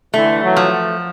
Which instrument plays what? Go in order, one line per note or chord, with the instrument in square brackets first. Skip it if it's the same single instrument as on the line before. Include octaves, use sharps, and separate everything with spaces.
[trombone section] D3 E3 [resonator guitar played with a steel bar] A3
[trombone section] E3 F#3
[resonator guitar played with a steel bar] F3